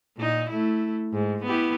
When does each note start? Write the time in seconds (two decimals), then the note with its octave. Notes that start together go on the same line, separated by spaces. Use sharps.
0.17 A#2 D#4
0.50 A3 E4
1.13 G#2
1.45 B3 E4 G4